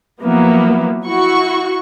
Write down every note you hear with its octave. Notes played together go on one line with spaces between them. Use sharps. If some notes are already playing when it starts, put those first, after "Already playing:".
F3 F#3 A#3 B3 E4
E4 F#4 C#6